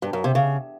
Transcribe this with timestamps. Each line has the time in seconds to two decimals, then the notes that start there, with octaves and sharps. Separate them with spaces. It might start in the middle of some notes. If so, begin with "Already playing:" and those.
0.02 G2
0.13 F#2
0.24 C3
0.35 C#3